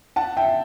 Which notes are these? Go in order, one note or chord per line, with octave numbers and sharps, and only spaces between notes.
F#5 A5
E5 G5